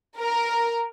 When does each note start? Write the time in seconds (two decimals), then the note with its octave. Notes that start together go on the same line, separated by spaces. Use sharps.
0.18 A#4